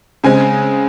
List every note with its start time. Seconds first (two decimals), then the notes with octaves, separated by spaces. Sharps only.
0.24 C#3 G#3 C4 G#5